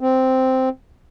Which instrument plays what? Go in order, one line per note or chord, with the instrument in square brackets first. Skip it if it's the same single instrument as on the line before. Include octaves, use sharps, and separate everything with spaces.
[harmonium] C4